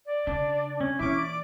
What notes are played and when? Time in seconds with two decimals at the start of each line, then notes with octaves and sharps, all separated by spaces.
0.06 D5
0.27 C#3 D4
0.81 C#4
0.99 A#2 E3 C#4 E4 D6
1.19 D5